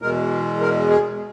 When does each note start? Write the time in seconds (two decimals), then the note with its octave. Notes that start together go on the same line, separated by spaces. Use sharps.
0.02 E2 B2 G#3 A#4
0.61 A#4
0.90 G#4